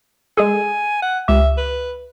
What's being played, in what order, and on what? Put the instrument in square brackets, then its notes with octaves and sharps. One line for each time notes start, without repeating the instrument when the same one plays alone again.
[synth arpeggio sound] G#3 G#4 A4 [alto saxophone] G#5
[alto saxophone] F#5
[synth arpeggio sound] C#2 G4 [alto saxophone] E5
[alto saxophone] B4